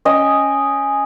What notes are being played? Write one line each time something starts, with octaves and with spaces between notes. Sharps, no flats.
C#4 D#5 G5 G#5